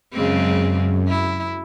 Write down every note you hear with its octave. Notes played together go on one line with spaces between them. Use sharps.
F#2 C#3 G#3 C4
E4